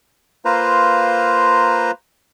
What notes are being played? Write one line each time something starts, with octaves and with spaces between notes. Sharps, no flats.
A#3 F4 B4 C5 A#5